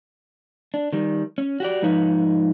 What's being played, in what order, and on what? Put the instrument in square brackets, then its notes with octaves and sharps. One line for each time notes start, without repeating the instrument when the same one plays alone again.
[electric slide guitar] D4
D#3 G3
C#4
F#4 G4 D5
G#2 F3 D#4 B4 C#5